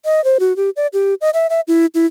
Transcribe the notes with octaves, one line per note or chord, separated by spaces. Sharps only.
D#5
C5
F#4
G4
D5
G4
D#5
E5
E5
E4
E4